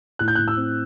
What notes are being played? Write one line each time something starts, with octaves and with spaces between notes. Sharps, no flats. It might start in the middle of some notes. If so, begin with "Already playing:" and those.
A2 F#6
G6
A2 F#6
E6
C4